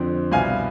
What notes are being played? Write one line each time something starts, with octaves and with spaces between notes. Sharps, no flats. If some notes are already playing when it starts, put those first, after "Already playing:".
Already playing: F2 D3 F3 C4
C2 B2 G3 F5 G#5